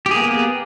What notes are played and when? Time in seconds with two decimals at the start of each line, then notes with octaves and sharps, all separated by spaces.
0.06 G4
0.11 G#4
0.16 A#3
0.21 B3